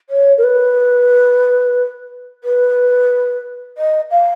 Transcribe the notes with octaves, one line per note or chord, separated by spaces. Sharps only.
C#5
A#4
B4
B4
D#5
F5